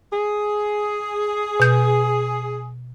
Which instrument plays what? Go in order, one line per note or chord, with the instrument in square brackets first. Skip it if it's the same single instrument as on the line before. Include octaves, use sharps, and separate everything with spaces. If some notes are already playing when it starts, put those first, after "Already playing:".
[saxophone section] G#4
[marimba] B2 G6